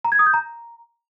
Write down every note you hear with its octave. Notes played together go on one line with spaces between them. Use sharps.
A#5
G#6
D#6
G6
A#5